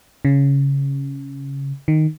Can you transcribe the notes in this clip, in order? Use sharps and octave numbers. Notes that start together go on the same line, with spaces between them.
C#3
D#3